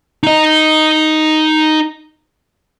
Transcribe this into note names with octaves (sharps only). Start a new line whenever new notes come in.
D#4 D#5